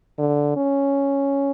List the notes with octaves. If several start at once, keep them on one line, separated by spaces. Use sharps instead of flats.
D3
C#4